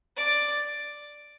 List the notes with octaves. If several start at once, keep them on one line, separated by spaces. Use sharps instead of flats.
D5